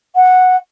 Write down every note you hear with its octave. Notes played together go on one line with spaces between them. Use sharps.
F#5